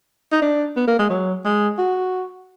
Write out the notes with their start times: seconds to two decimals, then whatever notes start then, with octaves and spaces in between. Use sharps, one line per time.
0.32 D#4
0.42 D4
0.77 B3
0.88 A#3
0.99 G#3
1.10 F#3
1.45 G#3
1.78 F#4